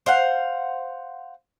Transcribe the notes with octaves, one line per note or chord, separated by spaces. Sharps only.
C5 F5 F#5